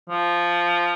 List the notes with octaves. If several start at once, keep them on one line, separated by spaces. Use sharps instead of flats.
F3